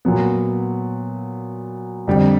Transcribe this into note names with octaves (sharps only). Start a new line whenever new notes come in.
A#2 F#3 B3
F2 D3 G3